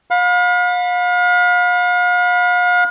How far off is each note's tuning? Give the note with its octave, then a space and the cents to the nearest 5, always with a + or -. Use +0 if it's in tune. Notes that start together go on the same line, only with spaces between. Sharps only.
F5 +40 B5 +0